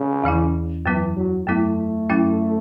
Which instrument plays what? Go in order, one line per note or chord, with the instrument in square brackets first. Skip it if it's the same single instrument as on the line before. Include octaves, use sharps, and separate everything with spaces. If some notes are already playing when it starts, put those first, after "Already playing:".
Already playing: [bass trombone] C#3
[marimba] E2 E3 C#4 E4
[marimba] F#2 F#3 B3 E4 [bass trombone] E3
[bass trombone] F#3
[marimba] F#2 F#3 B3 E4 [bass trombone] A3
[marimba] F#2 F#3 C#4 E4